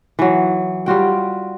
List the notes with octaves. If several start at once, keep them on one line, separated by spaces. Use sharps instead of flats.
E3 F#3
G3 F4 F#4 G5